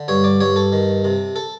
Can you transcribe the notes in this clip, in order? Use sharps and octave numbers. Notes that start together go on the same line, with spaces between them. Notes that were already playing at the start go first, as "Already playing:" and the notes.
Already playing: D3
G2 C#5
D5
G2 C#5
A4
D#3
C3
A4